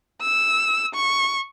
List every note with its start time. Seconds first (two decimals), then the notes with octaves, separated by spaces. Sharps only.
0.22 E6
0.94 C#6